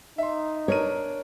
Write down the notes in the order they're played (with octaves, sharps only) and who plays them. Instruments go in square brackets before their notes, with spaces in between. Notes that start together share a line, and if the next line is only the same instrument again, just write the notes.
[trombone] D#4 [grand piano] E5 C6
[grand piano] D4 A#4 D#7 [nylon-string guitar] C#5